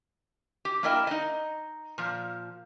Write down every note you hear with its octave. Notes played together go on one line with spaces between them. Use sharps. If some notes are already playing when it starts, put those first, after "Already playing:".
G4
A#3 D4 E4 A#4 D#5 G5
D#4 D#5
A#2 F3